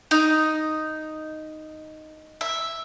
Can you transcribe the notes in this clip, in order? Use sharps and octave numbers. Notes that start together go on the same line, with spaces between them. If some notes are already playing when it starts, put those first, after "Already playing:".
D#4
E5